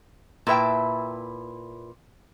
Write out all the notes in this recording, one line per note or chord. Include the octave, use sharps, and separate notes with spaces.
A#2 E4 B4 E5 G5 A5